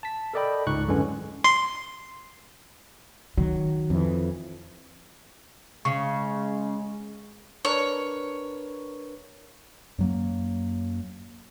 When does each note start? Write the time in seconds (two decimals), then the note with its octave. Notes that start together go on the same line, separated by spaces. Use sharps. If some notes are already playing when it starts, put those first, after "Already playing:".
0.03 A5 B6
0.34 A4 A#4 D5 D#5 G5 B5
0.67 C#2 G#2 D#4 C#6 F#6
0.88 F#2 D3 E3 G#3 C#4
1.44 C6
3.37 D#3 F#3
3.90 F2 E3
5.85 C#3 G#3 C#6
7.65 D4 A#4 B4 C#5
9.99 F#2 F#3 A#3